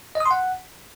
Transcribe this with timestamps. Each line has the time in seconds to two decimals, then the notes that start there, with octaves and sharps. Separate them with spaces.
0.15 D#5
0.20 D#6
0.26 C6
0.31 F#5